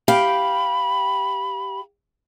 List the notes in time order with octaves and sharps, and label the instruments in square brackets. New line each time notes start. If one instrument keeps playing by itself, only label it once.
[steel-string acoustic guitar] G4 F5 G5 [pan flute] B5